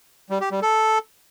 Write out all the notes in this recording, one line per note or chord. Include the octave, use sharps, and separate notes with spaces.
G3
G4
G3
A4